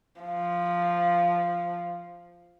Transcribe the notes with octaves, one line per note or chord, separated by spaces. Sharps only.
F3